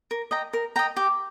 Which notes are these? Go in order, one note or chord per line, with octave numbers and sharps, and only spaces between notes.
A#4
D#5 G5 A#5
A#4
D#5 G5 A#5
G4